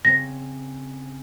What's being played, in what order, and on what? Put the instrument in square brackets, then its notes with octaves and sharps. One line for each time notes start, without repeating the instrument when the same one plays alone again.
[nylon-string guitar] C#3 C4 C#5 [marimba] A#6